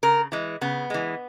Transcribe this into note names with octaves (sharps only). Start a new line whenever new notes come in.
C#3 A#4
E3 G#3
C#3 B3
E3 G#3